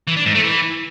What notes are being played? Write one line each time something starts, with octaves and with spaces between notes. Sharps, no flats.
E3
D4
G#2
A3
E3